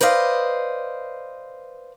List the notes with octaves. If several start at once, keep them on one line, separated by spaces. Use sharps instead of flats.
B4 C5 D5 D#5 F5